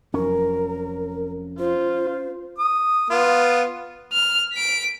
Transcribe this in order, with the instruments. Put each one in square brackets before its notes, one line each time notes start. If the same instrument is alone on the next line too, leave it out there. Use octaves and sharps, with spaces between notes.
[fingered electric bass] F1 F2 F#3 [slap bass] C#4 [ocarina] A#4
[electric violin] F4 [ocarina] C5
[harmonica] D#6
B3 F4
[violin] F6
B6 D7